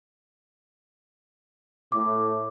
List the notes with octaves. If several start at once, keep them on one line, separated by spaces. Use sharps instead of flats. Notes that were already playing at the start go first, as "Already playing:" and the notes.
A2 D6